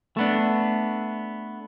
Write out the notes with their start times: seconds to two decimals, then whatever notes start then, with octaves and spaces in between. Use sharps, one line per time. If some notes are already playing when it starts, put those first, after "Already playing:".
0.17 A3 B3 D4